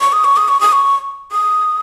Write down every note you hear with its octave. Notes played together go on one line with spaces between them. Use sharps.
C#6
D#6
C#6
D#6
C#6
D#6
C#6
D#6